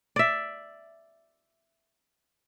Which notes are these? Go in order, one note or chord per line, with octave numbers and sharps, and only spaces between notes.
D5 E5